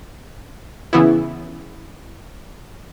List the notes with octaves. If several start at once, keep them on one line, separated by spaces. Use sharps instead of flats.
C#3 E3 B3 E4